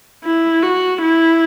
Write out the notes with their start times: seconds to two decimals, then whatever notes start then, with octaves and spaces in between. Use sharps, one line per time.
0.24 E4
0.62 F#4
1.02 E4